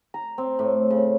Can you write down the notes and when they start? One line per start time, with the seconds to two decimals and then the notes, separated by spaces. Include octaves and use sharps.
0.14 A#5
0.38 C4
0.59 A2
0.90 C#3